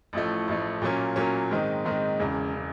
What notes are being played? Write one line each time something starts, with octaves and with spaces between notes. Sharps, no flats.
A1 A2 F3 A3
A1 A2 F3 A3
A#2 F#3 A#3 C#4
A#2 F#3 A#3 C#4
G#2 D#3 G#3 C4 D#4
G#2 D#3 G#3 C4 D#4
E1 E2 C#3
C#3